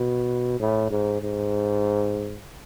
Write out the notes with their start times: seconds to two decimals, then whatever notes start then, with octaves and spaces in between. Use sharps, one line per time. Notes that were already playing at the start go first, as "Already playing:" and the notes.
Already playing: B2
0.60 A2
0.90 G#2
1.21 G#2